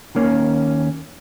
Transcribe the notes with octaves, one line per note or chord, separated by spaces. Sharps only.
D#2 D#3 A#3 C#4